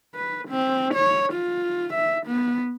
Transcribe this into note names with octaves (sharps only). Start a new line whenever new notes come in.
B4
C4
C#5
F4
E5
B3